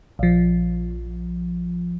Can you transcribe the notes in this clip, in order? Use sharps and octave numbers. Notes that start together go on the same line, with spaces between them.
A#1 F3